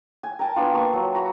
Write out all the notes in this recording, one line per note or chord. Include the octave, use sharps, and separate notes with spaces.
G#5
A#4 G5 A5
B3 D4 F4
A#3 A5 C#6
F#3
F#4 A#5 B5